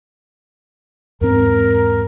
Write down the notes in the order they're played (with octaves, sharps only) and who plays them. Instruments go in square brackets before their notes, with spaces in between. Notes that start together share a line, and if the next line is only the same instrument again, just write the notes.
[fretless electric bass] E2 G#2 C4 [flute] A#4